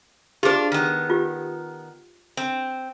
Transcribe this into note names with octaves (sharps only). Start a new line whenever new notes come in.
D4 F4 G4 G#4 C5
D#3 B3
F4 G4
C4